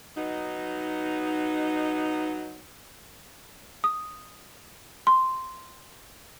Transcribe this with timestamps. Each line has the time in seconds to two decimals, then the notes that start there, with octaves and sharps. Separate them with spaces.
0.17 F#3 B3 D#4
3.84 D#6
5.07 C6